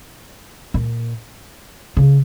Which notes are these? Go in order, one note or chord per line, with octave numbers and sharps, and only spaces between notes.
A#2
C#3